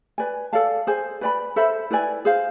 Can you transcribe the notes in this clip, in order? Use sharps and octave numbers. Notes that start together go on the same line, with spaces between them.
B4 D5 G#5
A4 D5 F5 A5
G#4 C5 G#5
B4 D5 G#5 B5
A4 C5 E5 B5
E4 B4 D5 G#5
G#4 C5 F5